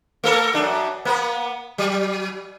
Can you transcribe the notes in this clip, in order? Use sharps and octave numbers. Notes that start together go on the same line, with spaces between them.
A3 A4 A#4
F#2 D4
A#3 B3
F#3